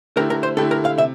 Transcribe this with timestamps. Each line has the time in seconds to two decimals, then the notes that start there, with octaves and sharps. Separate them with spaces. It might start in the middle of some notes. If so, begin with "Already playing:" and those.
0.16 D3 A3 E4 G4 A#4
0.30 A#4
0.43 C5
0.57 D3 A3 E4 G4 A4
0.71 A#4
0.85 F5
0.98 C3 E5